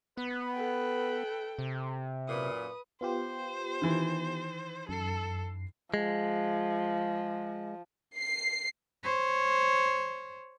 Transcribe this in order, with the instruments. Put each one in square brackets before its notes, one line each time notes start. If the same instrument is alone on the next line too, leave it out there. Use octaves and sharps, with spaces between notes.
[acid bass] B3 [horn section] B4
[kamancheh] A4 G5
[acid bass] C3
[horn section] F#2 A#2 [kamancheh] B4 D#6
[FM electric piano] B3 F4 G4 [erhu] C5
[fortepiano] D#3 E3
[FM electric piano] F#2 C7 [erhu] A4
[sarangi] F3 [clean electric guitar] G#3
[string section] C7
[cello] C5 C#5